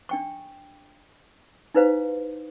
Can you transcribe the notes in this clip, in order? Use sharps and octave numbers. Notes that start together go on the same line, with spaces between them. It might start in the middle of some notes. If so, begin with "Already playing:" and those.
D4 G5 C#6
D#4 E4 B4 C5 F5